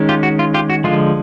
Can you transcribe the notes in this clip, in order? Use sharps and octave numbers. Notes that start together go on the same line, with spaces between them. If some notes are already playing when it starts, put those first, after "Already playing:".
Already playing: D#3 G#3 C#4
F4 G4
F#4
F4
F4 G4
F#4
D3 F3 G#3 F4